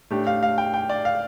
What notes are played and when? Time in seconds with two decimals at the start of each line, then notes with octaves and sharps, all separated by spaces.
0.11 A2 A3 D4 G4
0.27 F5
0.43 F5
0.58 G5
0.74 G5
0.89 D5
1.05 F5